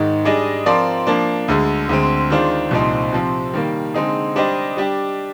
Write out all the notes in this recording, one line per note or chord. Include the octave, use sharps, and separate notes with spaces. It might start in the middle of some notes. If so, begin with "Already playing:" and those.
Already playing: G#2 D#3 G#3 D#4
G3 D4 G#4 D#5
F3 C4 F4 A#4 D5
F3 A#3 D4
D2 D3 G#3
D2 D3 G#3 C4
D#3 G#3 D4 F4 C5
C2 A#2 F3 C4 D#4
C3 F3 C4
D#3 G3 A#3
D3 G#3 C4 D#4 G#4
G3 D4 G4 C5 D#5
G3 D4 G4